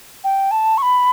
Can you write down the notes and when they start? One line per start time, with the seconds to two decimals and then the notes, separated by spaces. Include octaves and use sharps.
0.24 G5
0.51 A5
0.77 C#6
0.82 B5